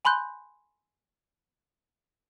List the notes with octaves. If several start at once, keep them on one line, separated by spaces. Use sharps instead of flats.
G#5 B5 C6 F#6 G6